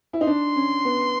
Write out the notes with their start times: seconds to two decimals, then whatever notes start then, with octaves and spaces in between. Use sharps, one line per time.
0.13 E4
0.21 D#4
0.27 D4 C6
0.56 C#4
0.85 B3